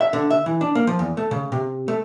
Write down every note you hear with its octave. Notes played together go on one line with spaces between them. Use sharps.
E5
D3
E5
E3
D4
A#3
F3
E2
A3
C#3
C3
A3